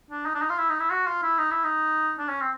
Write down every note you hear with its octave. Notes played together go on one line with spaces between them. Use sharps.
D4
D#4
D4
D#4
F4
E4
D#4
E4
F#4
F4
E4
D#4
E4
D#4
D4
C#4
C4